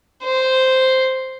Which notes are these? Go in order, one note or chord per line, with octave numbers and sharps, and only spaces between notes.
C5